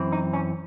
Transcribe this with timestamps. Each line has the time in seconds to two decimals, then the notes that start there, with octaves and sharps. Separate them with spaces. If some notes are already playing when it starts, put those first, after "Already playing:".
Already playing: F#2 E3 C4
0.12 D#4
0.33 C#4